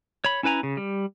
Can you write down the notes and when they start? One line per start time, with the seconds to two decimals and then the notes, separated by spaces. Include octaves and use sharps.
0.24 C#5 B5
0.43 C#4 E4 B4 G#5 A#5
0.63 C#3
0.77 G3